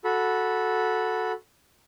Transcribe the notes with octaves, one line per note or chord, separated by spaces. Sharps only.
F#4 A4 B5